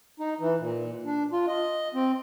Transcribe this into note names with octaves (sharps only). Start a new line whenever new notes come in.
D#4
E3
A#2
D4
F4
D#5
C4